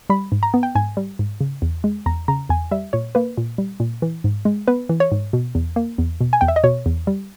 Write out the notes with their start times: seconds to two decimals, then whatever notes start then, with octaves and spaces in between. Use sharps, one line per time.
0.10 G3 B5
0.32 G#2
0.43 A#5
0.54 B3
0.63 G5
0.75 G#2 G#5
0.97 G3
1.19 G#2
1.41 C#3
1.62 E2
1.84 G#3
2.06 E2 A#5
2.28 C#3 A#5
2.49 E2 G#5
2.71 G3 E5
2.93 A#2 C#5
3.15 A#3 B4
3.37 A#2
3.58 G3
3.80 A#2
4.02 E3
4.24 G#2
4.45 G#3
4.68 B3 B4
4.89 E3
5.00 C#5
5.12 G#2
5.33 B2
5.55 E2
5.76 A#3
5.98 E2
6.21 B2
6.33 G#5
6.41 E2 G5
6.48 E5
6.56 D#5
6.64 B2 C#5
6.86 E2
7.07 G3